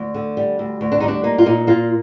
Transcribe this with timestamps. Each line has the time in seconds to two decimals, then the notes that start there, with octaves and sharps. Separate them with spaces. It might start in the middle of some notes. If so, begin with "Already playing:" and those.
Already playing: D2
0.14 D3
0.37 G3
0.59 D2
0.81 D2
0.92 D4
1.00 G3 D#4
1.08 D4
1.23 A#3 D#4
1.38 F4
1.46 A#2 D#4
1.67 A#3 F4